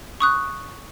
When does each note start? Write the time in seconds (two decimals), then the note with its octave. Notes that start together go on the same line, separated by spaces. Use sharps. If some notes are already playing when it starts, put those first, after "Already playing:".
0.20 C#6 D#6 F#6